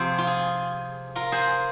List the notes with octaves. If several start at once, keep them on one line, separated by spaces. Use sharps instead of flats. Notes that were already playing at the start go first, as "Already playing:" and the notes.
Already playing: C3 F3 C4 G#4
F4
G#4
F4 A#4
G#4 C5